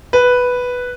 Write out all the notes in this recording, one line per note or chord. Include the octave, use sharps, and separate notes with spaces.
B4